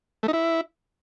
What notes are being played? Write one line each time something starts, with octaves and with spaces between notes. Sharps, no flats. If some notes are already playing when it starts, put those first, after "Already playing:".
A3
D#4
E4